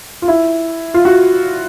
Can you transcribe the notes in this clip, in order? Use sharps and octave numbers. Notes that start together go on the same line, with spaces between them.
F4
E4
F4
F#4